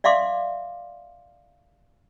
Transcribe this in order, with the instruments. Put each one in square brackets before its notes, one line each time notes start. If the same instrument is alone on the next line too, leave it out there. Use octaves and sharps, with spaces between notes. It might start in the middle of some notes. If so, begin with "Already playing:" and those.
[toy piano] D5 E5 F5 C6 D6